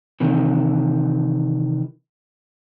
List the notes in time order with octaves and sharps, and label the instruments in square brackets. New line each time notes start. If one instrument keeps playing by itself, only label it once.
[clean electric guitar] C3 D#3 E3